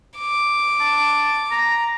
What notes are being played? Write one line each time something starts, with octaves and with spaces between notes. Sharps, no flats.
D6
A5
A#5